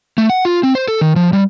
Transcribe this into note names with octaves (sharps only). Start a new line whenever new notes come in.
A3
F#5
F4
C4
C5
A4
D#3
F3
G3